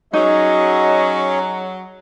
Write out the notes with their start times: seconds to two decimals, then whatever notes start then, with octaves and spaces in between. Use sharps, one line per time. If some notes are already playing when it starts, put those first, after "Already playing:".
0.13 F#3 C#4 D#4 G#4 C#5 D#5